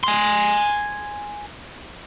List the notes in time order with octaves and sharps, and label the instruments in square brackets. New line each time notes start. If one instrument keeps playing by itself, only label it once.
[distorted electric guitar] G#5 C6